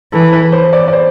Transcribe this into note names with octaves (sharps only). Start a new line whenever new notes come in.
E3 A4
B4
C5
D5
D5
C5